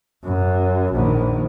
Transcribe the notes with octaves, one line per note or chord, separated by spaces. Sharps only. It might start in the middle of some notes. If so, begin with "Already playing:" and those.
F#2
A#1 D#3